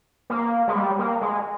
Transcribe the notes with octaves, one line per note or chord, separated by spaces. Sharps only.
A#3
G#3
G3
A#3
G#3